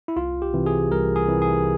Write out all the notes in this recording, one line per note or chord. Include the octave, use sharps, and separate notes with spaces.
E4
C2 F4
G4
C3 E3
G#4
C2 A#4
G#4
C3 E3
G#4